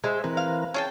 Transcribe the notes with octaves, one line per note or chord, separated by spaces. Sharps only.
G#3 C5 E5
E3 C4 A#4 B4
F5
C#4 G#4 G5 A5